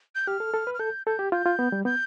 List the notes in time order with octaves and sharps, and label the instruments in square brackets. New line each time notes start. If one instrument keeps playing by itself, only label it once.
[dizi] G6
[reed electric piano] G4 [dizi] F6
[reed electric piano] A4
A4
B4
[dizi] F6
[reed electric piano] A4 [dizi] G6
[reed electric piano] A4 [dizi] G6
[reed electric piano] G4
[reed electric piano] F4 [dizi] G6
[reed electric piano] F4
B3
G3
[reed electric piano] B3 [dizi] G6